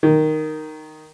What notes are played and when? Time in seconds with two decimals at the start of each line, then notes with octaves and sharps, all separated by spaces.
0.03 D#3